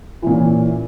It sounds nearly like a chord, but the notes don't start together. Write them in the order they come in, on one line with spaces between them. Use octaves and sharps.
E3 A#2 C#4